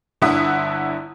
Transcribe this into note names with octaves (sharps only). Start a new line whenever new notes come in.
G1 D3 E4 E5 F#5 D#6